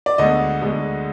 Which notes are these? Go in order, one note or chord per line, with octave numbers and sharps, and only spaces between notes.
D5
D2 D3 G#3 B3 D#5
D2 D3 G#3 B3